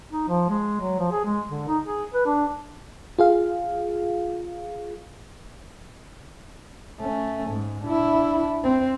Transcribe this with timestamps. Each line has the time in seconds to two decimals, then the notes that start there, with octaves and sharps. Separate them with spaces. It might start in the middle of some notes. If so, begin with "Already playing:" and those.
0.12 D#4
0.28 F3
0.50 G#3
0.81 F#3
0.99 F3
1.12 G#4
1.25 G#3
1.50 D3
1.68 D#4
1.85 G#4
2.14 B4
2.26 D4
3.19 F4 G#4 F5
7.00 A3 C#4
7.50 G#2
7.84 D4 E4
8.64 C4